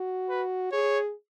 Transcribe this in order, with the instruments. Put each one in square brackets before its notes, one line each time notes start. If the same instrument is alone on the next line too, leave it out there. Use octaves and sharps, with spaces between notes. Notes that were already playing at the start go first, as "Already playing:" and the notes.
Already playing: [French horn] F#4
[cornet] B4
[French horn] G#4 [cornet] C#5